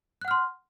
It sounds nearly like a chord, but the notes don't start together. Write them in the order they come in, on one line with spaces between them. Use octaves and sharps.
F#6 F#5 F6 C6